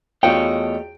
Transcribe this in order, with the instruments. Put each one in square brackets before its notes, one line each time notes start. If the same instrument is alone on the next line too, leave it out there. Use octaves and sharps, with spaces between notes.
[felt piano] E2 F4 F#4 [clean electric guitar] A3 C#5 D#5 [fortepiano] G5